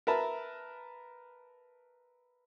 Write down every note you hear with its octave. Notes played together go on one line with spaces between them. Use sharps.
A#4 B4 E5 A5 B5